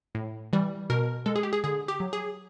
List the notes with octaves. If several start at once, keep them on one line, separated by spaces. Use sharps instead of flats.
A2
E3 G3
B2 A#4
G#3 A4
G#4
G4
G#4
D3 G#4
G4
F#3
G#4